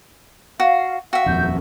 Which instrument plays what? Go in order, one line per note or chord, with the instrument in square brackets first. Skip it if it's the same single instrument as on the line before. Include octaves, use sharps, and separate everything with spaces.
[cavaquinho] F#4 [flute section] F5
[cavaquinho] F#4 E5 [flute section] F5 G5
[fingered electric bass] D#1 F2 [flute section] G6